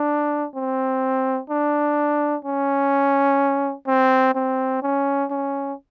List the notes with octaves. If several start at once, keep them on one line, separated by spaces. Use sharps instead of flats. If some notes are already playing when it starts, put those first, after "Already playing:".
Already playing: D4
C4
D4
C#4
C4
C4
C#4
C#4